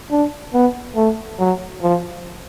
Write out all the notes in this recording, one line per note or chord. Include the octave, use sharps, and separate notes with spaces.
D4
B3
A3
F#3
F3